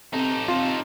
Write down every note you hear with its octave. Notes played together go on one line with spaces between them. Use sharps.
C3 D#4 A4
C3 F4